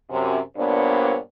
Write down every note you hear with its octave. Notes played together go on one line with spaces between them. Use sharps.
F#2 C3
G2 A#2 B3 D4 C5 C#5